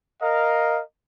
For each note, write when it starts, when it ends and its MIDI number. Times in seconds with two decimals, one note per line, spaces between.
0.22 0.81 70
0.22 0.81 75
0.22 0.81 77